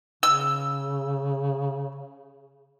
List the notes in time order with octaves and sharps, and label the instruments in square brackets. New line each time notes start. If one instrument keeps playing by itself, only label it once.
[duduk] C#3 [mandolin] E6